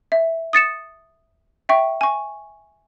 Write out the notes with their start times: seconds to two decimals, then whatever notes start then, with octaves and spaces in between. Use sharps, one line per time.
0.12 E5
0.53 D#6 A6 C#7 E7
1.69 E5 G5 C#6
2.01 G#5 C#6